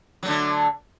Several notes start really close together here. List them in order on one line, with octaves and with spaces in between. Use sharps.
F#3 A3 D3